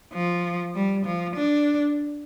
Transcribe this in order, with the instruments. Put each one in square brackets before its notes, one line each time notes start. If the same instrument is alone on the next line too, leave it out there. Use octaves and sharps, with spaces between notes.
[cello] F3
G3
F3
D4